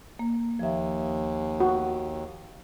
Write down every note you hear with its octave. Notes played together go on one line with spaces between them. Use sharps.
A#3
D#2 F3 E5
F#4